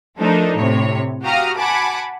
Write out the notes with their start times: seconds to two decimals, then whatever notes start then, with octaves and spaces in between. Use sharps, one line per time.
0.19 F3 A3 D4 D#4 A4 A#4
0.56 A2 C3 C#5
1.23 F#4 G4 F5 A#5 D#6 F6
1.58 F#5 G#5 A5 B5 D6